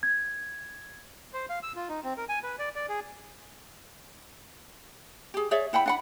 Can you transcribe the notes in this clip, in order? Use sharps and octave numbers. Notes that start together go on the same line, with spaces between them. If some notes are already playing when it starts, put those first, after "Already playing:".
G#6
C5
F5
E6
F4
D#4
C4
A#4
G#5
B4
D5
D5
G#4
G4 G#4
G#4 C#5 D5 E5
E4 F#5 G5 B5
D4 F#5 B5